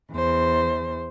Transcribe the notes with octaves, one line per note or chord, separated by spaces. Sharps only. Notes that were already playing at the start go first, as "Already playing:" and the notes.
E2 C5